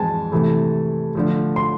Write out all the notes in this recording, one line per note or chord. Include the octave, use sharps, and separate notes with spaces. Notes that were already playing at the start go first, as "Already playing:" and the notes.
Already playing: F2 E3 G#3 G#5 A5
C3 E3 A3
D3 F3 A3
C6